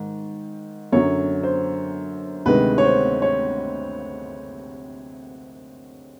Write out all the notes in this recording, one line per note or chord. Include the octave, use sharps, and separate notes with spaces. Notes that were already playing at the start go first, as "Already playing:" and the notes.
Already playing: G#2 D#3
F#2 D3 F#3 C#5
C5
D2 C3 D#3 G#3 B4
C#5
C5
C#5